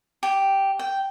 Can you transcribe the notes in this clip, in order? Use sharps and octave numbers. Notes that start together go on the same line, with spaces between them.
G4
G5